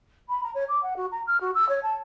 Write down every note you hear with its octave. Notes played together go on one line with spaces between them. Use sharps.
B5
A#5
C#5
D6
F#5
F#4
A#5
F6
F#4
E6
C#5
A5